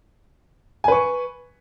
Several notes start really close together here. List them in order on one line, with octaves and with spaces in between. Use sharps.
G#5 B4 C#6